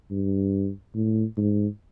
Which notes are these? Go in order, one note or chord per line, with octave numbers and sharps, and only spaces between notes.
G2
A2
G#2